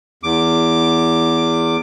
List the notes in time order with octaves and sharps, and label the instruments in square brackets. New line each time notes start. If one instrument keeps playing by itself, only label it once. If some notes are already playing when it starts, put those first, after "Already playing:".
[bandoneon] E2 D6